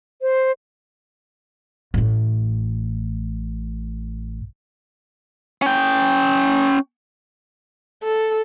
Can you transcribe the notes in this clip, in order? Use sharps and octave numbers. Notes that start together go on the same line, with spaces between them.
C5
A1 A2
C#4 G5
A4